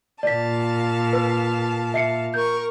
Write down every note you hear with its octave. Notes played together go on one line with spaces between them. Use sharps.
A#2 D5 F5 A5 B6
B4
E5 C7 C#7
A#4 C#6 G6